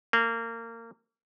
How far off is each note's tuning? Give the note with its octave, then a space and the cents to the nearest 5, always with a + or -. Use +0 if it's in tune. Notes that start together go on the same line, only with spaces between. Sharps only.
A#3 -25